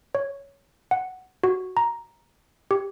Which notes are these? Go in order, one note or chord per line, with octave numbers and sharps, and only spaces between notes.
C#5
F#5
F#4
A#5
G4